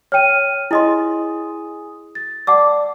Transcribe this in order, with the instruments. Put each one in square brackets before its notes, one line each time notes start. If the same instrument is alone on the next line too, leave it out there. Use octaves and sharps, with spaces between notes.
[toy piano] C#5 G5 [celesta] F6 D#7
[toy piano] E4 D#5 C6 [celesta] G#4 G#5 D#6
[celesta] A6
[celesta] D5 A5 [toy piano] F#5 D6 E6